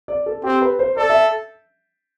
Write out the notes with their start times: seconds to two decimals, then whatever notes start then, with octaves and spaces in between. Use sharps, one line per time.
0.08 D5
0.26 A4
0.43 C4 G4
0.62 B4
0.79 C5
0.97 A4 D5
1.10 E5